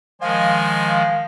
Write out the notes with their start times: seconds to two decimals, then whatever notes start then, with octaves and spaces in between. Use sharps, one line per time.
0.22 D#3 F3 G#3 C5 D#5 F5 G#5